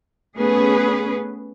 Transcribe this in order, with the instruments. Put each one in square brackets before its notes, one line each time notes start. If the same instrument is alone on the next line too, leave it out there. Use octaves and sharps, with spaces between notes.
[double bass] A3 B3 [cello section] C#4 G#4 B4